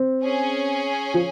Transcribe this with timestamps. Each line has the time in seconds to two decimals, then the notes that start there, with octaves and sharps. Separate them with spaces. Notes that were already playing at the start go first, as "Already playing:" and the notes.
Already playing: C4
0.23 C#4 G#4 C#5 G#5
1.14 F3